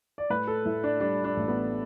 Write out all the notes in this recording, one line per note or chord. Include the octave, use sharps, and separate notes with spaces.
D5
A2 B4
A4
A2 E4
D4
G3 D4
D4
A1
B3